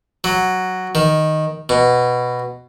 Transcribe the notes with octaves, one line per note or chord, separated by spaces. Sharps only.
F#3
D#3
B2